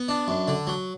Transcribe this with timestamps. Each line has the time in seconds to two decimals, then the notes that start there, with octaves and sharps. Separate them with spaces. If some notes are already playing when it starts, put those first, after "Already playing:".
Already playing: B3
0.08 D4
0.28 F#2
0.48 D3
0.67 F#3